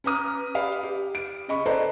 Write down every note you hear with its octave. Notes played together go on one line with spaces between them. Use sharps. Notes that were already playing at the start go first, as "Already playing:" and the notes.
C#4 B4 A#5 D#6 F6
G4 B4 D5 F5 B5
G4
D7
C#3 D#5 B5 C#6
A4 B4 C5 D5 D#5 A#5